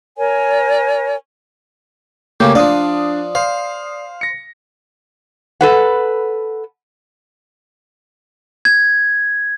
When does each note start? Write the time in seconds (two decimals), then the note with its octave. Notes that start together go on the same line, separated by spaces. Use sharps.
0.17 A#4 C#5 G#5
2.40 C#3 A3 A#3 G4 G6
2.55 F3 D4 D5 F5 D#6
3.35 C5 F5
4.21 A#6 C#7
5.61 A4 B4 F#5
8.65 G#6